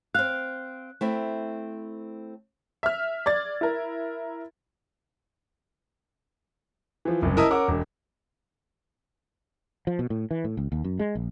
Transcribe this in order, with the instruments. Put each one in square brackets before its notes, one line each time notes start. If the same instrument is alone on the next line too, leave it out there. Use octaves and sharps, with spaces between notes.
[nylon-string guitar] C4 F5 [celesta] F#6
[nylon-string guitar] A3 C4 E4
[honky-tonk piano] E5 F6
D5 G#6 A6
E4 A#4
[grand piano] E3 F3
F#1 C2
E4 A#4 D#5 A5 D#6 E6
C#4 A#4 F#5 D6
E1
[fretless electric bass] F3
B2
A2
E3
A2
C#2
D#2
F#2
G#3
A#1